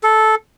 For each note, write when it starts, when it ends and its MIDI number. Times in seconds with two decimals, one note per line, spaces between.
0.03 0.35 69